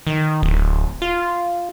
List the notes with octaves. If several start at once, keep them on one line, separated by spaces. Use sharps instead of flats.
D#3
D1
F4